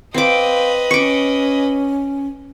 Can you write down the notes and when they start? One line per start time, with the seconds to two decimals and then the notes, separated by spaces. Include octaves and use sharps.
0.14 C4 B4 D#5 F5 D6
0.91 C#4 C#6 D6